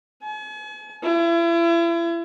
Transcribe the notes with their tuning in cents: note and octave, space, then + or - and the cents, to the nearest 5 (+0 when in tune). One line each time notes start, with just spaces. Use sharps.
G#5 +45
E4 +35